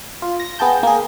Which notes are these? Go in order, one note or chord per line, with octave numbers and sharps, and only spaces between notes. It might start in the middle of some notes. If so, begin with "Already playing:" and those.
F4
A#6
B3 G#4 G5 A5 G6
A#3 G#4